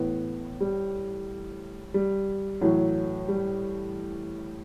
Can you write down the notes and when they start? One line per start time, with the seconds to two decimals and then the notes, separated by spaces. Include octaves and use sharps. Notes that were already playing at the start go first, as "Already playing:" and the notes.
Already playing: A2 E3 B3
0.61 G3
1.94 G3
2.61 A2 E3 F#3
3.28 G3